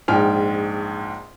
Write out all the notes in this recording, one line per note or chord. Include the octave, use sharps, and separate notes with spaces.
A#1 G#2 G5 F6